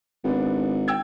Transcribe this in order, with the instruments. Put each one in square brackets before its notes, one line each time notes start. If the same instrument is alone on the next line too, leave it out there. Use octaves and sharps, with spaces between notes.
[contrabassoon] G#1 [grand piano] B3 D4
[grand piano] G5 E6 G#6